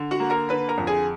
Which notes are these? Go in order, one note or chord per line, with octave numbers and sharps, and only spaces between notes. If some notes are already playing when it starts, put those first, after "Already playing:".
Already playing: D3
F#4 F#5
A#3
A#4 A#5
D3 B4 B5
A#4 A#5
F2
G#4 G#5